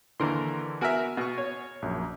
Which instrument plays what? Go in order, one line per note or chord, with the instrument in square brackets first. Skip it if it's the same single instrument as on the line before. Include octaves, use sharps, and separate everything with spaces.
[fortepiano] D#2 A#4 C6 [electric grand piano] D3 E3
[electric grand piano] B3 G#5 F6 [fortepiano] F#4 A#4 E5
[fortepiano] B2 C#6
C#5
[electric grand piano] A#1 F#2